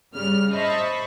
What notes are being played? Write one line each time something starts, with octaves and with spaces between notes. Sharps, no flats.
G2 C#3 G3 F6
C5 D#5 E5 A5 B5 C#6